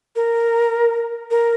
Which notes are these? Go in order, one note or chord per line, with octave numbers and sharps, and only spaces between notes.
A#4
A#4